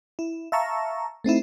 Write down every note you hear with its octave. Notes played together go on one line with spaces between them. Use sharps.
E4
E5 F5 A5 A#5 C#6 E6
A3 C4 D#4 E4